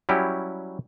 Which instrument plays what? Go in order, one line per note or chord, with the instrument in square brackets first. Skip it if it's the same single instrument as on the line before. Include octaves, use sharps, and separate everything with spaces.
[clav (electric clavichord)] F#3 G3 C#4 E4 G4